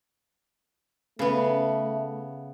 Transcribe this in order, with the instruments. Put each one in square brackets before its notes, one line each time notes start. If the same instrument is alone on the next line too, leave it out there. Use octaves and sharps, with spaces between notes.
[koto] C#3 B3 [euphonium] A3